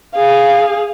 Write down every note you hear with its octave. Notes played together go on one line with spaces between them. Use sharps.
G#4 F5